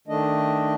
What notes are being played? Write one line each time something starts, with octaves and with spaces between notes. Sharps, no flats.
D#3 A3 D4 D#5